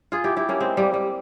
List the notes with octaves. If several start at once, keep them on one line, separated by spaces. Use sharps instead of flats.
F4 G#4
E4 G4
E4 G4
A#3 C#4
G#3 C4
G3 A#3
G3